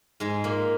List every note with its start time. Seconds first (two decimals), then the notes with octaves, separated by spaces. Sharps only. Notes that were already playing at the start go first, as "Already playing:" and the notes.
0.20 G#2 G#3
0.44 A#2 A#3